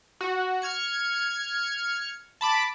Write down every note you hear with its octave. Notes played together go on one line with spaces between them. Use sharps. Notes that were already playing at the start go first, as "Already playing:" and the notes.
F#4
F6 G#6 C#7
A5 B5 D6